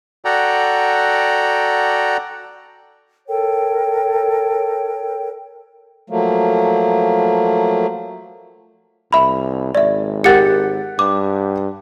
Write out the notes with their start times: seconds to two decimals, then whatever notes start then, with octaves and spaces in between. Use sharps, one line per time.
0.25 F#4 A4 D5 F#5 G5 A#5
3.28 A4 A#4 C#5 G5
6.10 F3 F#3 A3 A#3
9.13 C2 E5 B5
9.75 G#1 D5 E5
10.24 G4 A#4 F#5 A6 C#7
10.99 G2 D6